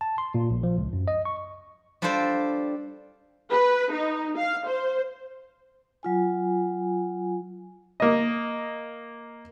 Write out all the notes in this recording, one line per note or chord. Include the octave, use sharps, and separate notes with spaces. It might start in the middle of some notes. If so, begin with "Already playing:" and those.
A5
C6
A#2
A#1
F3
C#2
F#2
D#5
C#6
G3 D4 F4 A4 C5 D5
B4
D#4
F5
C5
F#3 F4 G#5
A#3 D#5